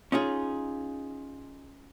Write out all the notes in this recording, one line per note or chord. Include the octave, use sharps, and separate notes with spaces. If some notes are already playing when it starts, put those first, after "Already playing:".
C#4 D#4 F4 G#4